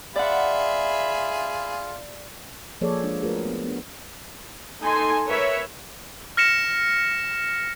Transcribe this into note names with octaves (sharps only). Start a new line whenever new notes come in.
F4 G#4 D5 E5 F#5 B5
F3 A#3 G#4 A4 C#5 D5
G#3 D4
A3 F4 F#4 G#4 A#4 B4
B3
B3 D4
D#4 A4 G#5 C6
A#4 B4 C#5 E5
F6 A#6 C#7 E7